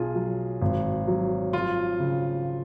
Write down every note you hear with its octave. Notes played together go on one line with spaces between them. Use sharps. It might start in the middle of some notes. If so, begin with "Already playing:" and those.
Already playing: B1 F4 G#4
F#3
G#1
F#3
F3 F4
C#3